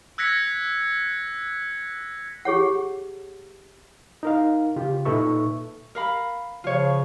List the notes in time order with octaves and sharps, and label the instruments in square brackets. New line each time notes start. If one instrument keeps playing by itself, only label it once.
[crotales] E6 F#6 G#6 A#6 B6 C#7
[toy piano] G4 G#4 C#5 F#5
[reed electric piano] D#4 A#4 F5
C#3 F4 G4
A#2 D#4 A4 B4 E5 C#6
[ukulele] A#4 F5 B5
[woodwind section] C#3 F3 [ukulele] F4 C#5